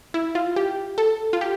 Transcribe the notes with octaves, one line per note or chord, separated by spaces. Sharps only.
E4
F4
G4
A4
F4
G4